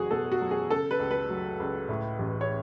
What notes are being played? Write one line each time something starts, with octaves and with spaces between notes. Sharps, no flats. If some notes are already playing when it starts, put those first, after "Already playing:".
Already playing: F#1 E2 F#4 G#4
B2 A4
F#4
F#3
G#4
C#3 A4
B4
C#2
B4
F#3
C#2
A2
A1
C#5